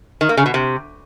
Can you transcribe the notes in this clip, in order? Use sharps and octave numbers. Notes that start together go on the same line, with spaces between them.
D#3
A#3
C#3
B2
C3